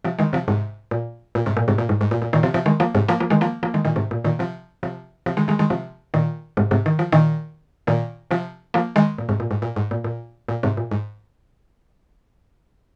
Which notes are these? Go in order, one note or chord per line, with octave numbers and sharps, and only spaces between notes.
C3 F3
D#3 G#3
C3 F3
G#2 C3
A#2
A#2
G#2 C3
A#2
G#2 C3
A#2
G#2
G#2
A#2
A#2
A#2 D#3
C3 F3
C3 F3
D#3 G#3
F3 A#3
G#2 C3
F3 A#3
F3 A#3
D#3 G#3
F3 A#3
F3 A#3
D#3 G#3
A#2 D#3
G#2 C3
A#2
A#2 D#3
C3 F3
C3 F3
C3 F3
D#3 G#3
D#3 G#3
D#3 G#3
C3 F3
A#2 D#3
G#2 C3
G#2 C3
D#3
F3
A#2 D#3
A#2 D#3
C3 F3
F3 A#3
D#3 G#3
A#2
G#2 C3
A#2
G#2
A#2
G#2
A#2
A#2
A#2
G#2 C3
A#2
G#2